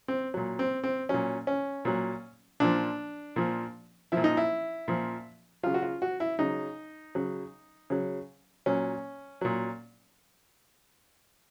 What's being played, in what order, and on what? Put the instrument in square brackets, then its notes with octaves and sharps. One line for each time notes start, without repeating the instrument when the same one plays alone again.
[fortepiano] C4
A#2 F#3
C4
C4
A#2 F#3 C#4
C#4
A#2 F#3
A#2 F3 D4
A#2 F3
A#2 F3 E4
D#4
E4
A#2 F3
C#3 F#3 F4
F#4
F4
F#4
E4
C#3 F#3 D#4
C#3 F#3
C#3 F#3
A#2 F#3 C#4
A#2 F#3